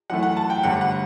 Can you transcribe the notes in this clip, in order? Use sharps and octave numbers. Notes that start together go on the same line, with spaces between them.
F#2 E3 A3 F#5
F#5
A5
G5
G1 G2 D3 A3 F#5
F#5